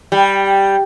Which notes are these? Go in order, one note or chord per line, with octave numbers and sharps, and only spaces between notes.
G3